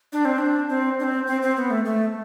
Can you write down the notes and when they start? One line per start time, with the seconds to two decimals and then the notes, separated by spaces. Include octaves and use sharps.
0.13 D4
0.25 C4
0.38 D4
0.69 C4
0.99 D4
1.04 C4
1.27 C4
1.42 C4
1.57 B3
1.70 A3
1.85 A3